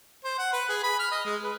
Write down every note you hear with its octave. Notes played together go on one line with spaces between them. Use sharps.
C5
F#5
B4
G#4
B5
F6
D#5
G#3
B4